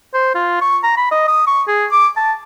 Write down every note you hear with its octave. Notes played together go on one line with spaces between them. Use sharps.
C5
F4
C#6
A#5
B5
D#5
D#6
C#6
G#4
D6
A5